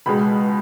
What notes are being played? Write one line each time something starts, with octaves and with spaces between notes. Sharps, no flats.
C#2 B2 G#3 B5